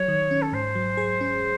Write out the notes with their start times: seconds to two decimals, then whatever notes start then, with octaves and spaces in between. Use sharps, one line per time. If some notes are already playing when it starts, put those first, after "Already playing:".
Already playing: F#3 C#5
0.08 D#3
0.31 C#4
0.42 A4
0.52 G#2 C5
0.75 F#3
0.97 G#4
1.21 C#4